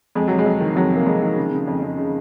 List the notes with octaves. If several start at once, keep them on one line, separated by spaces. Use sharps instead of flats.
F2 G#3
C3 F#3
G#3
F2
D#3
F2 F#3
C3
A#3
F2 G#3
D#3
C#3
C#3
F2
F2
C#3